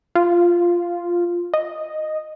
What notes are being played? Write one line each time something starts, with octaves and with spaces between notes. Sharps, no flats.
F4
D#5